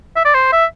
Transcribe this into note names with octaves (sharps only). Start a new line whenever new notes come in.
E5
D5
C5
E5